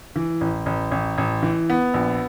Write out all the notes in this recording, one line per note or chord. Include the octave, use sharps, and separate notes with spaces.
E3
A1
A1
A1
A1
E3
B3
A#1